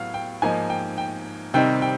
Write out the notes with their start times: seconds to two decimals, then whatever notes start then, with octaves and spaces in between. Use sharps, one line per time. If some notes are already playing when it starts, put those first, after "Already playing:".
Already playing: A2 F#3 B3 F5
0.14 G5
0.42 G#2 F3 A#3 D#4 G#5
0.70 G5
0.98 G5
1.54 C3 D#3 G3 C4 D#4 G5
1.82 G5